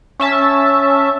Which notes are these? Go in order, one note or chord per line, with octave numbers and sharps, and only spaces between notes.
C#4 E5 A5